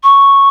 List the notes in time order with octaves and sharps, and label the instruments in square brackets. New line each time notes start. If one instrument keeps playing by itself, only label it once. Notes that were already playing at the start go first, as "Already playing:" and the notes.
[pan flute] C#6